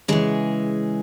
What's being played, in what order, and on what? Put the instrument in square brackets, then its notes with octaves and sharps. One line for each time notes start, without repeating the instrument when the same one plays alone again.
[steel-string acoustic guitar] C#3 E3 G#3 G#4